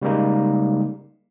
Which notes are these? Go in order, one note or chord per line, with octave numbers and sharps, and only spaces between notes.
C#3 G3 G#3 A#3 D#4